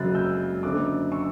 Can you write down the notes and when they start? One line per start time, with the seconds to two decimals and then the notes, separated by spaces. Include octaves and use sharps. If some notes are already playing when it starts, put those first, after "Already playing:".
Already playing: F#1 F#2 C#3 F#3 F#6 A6
0.15 E6 G6
0.63 F#1 F#2 D3 D6 F#6
1.12 C#6 E6